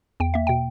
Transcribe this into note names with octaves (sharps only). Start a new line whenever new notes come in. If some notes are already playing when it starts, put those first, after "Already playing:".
E2 G5
A#3 E5
B2 G5